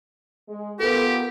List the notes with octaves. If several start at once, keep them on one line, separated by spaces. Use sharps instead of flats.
G#3
B3 F4 G4 A4 A#4